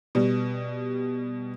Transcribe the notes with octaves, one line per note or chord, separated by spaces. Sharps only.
B2 G3